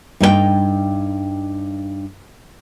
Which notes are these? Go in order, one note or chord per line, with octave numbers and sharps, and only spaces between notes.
G2 D#4 A4 G5